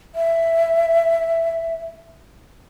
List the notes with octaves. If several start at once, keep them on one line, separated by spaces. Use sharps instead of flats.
E5